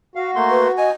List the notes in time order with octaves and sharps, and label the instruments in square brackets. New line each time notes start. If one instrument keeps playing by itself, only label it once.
[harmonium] F#4 [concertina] F5
[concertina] A3 A#3 C6
[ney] B4
[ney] D#5 [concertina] G#5